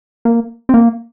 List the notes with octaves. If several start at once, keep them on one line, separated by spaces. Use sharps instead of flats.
A#3
C4
A#3